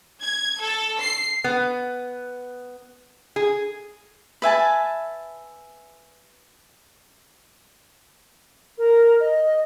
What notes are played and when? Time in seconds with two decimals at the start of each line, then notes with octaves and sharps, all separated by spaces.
0.21 G#6
0.60 A4
1.00 C7
1.44 B3
3.36 G#4
4.42 B4 E5 G#5 A5
8.78 A#4
9.20 D#5